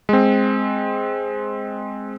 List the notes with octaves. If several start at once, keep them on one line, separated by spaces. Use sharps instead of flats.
G#3 C4